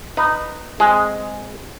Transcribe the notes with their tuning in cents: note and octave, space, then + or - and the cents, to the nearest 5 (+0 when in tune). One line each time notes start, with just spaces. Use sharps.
D#4 -15 B4 +0
G#3 +0 C4 +0 G#4 +5